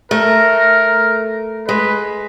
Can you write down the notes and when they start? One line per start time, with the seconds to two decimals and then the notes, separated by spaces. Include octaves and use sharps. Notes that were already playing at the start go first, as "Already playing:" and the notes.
0.11 A3 A#4
1.68 G#3 B4